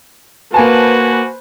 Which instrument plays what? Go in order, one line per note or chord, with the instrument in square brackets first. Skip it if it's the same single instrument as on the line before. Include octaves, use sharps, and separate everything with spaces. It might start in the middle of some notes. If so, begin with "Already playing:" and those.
[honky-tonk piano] A#3 G#5 A5 [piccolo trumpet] F#4 [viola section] B4 C5